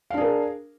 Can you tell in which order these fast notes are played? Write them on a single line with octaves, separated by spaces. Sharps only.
F5 D4 G#4 A#4